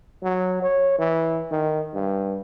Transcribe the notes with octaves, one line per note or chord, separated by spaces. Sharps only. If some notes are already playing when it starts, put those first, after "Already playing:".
F#3
C#5
E3
D#3
G2